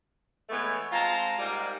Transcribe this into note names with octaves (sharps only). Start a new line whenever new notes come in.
E3 G#3 A3 B3 E4 C#5
G#3 C4 F4 A5 A#5
G#2 G3 A#3